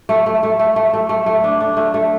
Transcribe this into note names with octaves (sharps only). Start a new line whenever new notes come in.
A3
A3
A3
A3
A3
A3
A3
A3
D4
D4
A3
A3